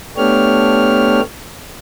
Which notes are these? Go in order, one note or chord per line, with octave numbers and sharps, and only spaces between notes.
A3 B3 D4 G4 C#5 F6